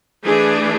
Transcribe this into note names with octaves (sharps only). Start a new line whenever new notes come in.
E3 A3 D4 G#4